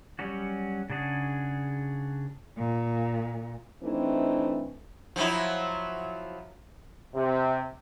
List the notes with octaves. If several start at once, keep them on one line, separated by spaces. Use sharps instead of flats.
F#3 G3 C#4 F#4
C#3 D4 F#4 G#4
A#2
E3 A3 C4 D4 D#4
F3 F#3 E4
C3